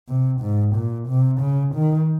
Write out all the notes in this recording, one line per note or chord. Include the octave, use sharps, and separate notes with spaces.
C3
G#2
A#2
C3
C#3
D#3